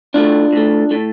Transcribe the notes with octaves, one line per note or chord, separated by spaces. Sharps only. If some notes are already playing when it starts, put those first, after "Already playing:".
A2 A3 D4 F4
A2 A3
A2 A3